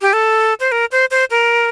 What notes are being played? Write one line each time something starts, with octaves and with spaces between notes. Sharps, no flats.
G4
A4
C5
A#4
C5
C5
A#4